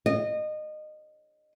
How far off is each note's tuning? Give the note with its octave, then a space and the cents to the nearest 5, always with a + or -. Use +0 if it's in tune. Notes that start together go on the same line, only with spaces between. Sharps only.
D#5 -25